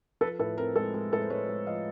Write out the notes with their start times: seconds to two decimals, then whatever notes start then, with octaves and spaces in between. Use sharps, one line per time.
0.21 F3 A4 B4
0.39 A2 A4 B4
0.58 C4 A#4
0.76 G#3 A4
0.94 G#3 A#4
1.12 A2 A4 B4
1.22 C5
1.30 G#3 B4 C#5
1.49 G#3
1.66 F3 D#5 F5